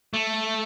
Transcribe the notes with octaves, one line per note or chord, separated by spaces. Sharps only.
A3